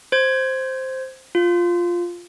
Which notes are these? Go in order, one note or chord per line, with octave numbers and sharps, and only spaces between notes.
C5 G#6
F4